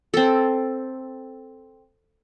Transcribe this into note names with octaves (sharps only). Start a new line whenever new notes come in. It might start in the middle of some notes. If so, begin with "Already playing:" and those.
C4 A4